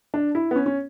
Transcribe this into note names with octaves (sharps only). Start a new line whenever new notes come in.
D4
E4
B3
C#4
C#4